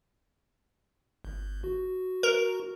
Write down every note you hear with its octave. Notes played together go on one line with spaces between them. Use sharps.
G1
F#4
A#4